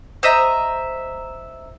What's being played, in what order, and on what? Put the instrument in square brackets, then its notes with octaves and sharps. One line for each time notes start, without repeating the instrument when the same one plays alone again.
[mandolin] C5 D#5 E5 A#5